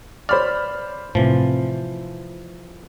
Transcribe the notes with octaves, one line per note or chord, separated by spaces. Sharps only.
C5 D5 B5 F6
A2 C3 E3 F3